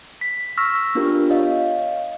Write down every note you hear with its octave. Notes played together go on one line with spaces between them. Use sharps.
B6
C#6 E6 F6 A#6 B6
B3 D4 F4 G4 A#4
C#5 D#5 F5